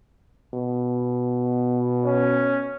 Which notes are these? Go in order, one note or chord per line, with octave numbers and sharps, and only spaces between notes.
B2
C#4